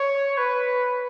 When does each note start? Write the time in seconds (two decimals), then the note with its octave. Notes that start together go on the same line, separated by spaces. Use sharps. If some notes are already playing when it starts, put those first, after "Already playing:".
Already playing: C#5
0.37 B4